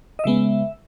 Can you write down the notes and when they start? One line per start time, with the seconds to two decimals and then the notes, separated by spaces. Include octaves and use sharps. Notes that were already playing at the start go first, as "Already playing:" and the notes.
0.19 D#5
0.24 C#3 G#3 B3 E5